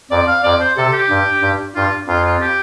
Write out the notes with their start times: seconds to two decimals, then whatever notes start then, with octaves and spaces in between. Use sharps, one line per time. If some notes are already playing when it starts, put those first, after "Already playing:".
0.11 F2 D5
0.28 F5
0.43 F2 D5
0.60 C5
0.77 C3 A4
0.93 G4
1.10 G2
1.42 G2
1.76 G2 F4
2.07 F2 F4
2.24 F4
2.41 G4